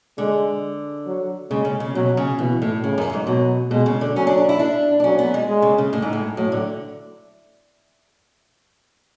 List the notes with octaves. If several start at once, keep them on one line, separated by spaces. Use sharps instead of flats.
D3 G#3
F#3
C#3 G#3
C#3
C#3
B2 F#3
C#3
B2 E3
A2
A2 C#3
F#2
G#2
B2 F#3
B2 G#3
C#3
D3
F#3 C#4
D4
D4
E4
D4
D4
F#3 C#4
B3
G#3
G#3
C#3
C#3
A2
G#2
A2
A2 F#3
D3